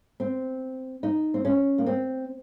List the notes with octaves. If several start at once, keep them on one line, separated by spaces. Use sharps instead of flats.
C4
D#4
C4
C#4
A#3
C4